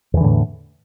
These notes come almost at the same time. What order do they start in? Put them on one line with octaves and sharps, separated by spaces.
E2 E3 D3 A2